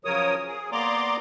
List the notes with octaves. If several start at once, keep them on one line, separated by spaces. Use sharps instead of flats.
C#3 F3 F#3 A#4 C#5 D#6
G#4
A#3 B3 D5 A#5 C6 D6